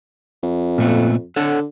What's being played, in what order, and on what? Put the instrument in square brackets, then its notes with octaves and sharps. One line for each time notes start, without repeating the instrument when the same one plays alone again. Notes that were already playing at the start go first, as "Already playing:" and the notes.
[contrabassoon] F2
[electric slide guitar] A#2 A3 B3
[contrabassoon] D3 [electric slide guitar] A4 C#5 F#5